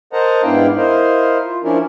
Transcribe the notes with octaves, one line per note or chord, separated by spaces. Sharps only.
A#4 C5 D#5 F#5 A5 A#5
G#2 B3 D4 E4 F5 G5
E4 A#4 C5 D#5 F5
F4
F3 C#4 D4 E4 A#4